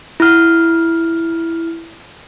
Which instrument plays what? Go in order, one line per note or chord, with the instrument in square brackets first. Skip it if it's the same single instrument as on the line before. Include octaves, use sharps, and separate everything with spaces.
[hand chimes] E4 F6